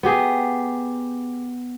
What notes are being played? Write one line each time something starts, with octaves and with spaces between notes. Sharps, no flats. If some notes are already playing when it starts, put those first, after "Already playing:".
B3 G4 G#4